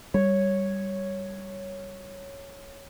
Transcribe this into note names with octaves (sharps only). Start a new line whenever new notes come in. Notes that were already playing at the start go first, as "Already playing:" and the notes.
G3 C#5